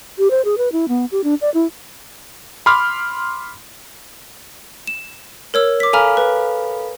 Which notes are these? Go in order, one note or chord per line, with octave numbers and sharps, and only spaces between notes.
G4
C5
G#4
B4
E4
B3
G4
D4
D5
E4
B5 C6 D6 F6
E7
A#4 C#5 E6
D6 B6
A4 F5 G#5 A#5 B5 F6
B4